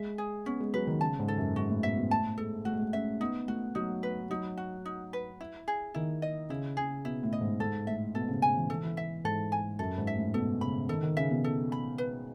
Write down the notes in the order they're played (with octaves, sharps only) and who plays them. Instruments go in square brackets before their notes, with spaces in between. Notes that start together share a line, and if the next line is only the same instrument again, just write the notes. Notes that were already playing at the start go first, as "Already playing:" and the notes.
Already playing: [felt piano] G#3 [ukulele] E5
[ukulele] G#4
[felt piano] B3 [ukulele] C#4
[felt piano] G#3
[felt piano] F#3 [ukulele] B4
[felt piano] D#3
[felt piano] C#3 [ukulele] A5
[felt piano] G#2
[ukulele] A4
[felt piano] F#2
[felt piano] G#2 [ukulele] F#4
[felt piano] A2
[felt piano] B2 [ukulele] E5
[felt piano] B2
[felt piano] A2 [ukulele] A5
[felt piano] G#3 [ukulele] A4
[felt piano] A3 [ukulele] F#4
[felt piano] G#3
A3
[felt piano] C#4 [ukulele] E5
[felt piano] B3 [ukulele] D#4
[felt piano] A3 [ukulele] F#4
[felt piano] F#3 [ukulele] D#4
[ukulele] B4
[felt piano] F#3 [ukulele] D#4
[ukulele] F#4
D#4
B4
E4
G#4
[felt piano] D#3 [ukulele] E4
[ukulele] D#5
[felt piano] C#3 [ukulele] E4
[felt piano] C#3 [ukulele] G#4
[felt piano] B2 [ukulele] E4
[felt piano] A2
[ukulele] D#5
[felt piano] G#2
[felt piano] G#2 [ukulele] A4
[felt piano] A2 [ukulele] E5
[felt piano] B2 [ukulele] A4
[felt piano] C#3
[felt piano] C#3 [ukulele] G#5
[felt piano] E3
[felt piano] E3 [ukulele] A4
[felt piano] E3
[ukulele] E5
[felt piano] G#2 [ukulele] A4
[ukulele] G#5
[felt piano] F#2 [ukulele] A4
[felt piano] G#2
[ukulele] E5
[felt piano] A2
[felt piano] B2 [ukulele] A4
[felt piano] C#3 [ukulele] B5
[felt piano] D#3 [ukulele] A4
[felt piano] D#3
[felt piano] C#3 [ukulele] E5
[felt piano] B2
[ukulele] A4
B5
B4